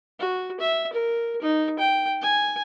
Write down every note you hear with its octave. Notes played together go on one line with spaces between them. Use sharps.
F#4
E5
A#4
D#4
G5
G#5